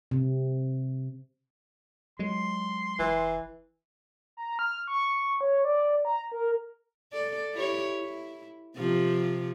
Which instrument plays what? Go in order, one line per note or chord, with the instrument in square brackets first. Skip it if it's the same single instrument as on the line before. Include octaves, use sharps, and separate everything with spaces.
[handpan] C3
[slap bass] F#3 G#3 [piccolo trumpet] C6
[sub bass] F1 [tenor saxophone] E3
[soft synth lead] A#5
F6
C#6
C#5
D5
A#5
A#4
[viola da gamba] A4 D5
E4 G4 C#5
E4
C3 F3 G4